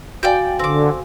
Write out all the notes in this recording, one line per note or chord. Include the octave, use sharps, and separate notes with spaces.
F#4 D5 F5 G5 G#5 G6
D3 C4 D6